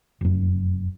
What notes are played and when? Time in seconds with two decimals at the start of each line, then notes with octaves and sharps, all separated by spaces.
0.21 F1 F#2